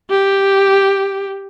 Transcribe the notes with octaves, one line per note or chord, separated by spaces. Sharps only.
G4